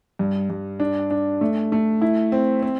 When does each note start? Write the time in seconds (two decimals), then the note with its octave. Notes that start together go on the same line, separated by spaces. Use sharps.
0.19 G2
0.50 G2
0.80 D4
1.11 D4
1.41 A3
1.72 A3
2.01 E4
2.32 C4
2.62 C4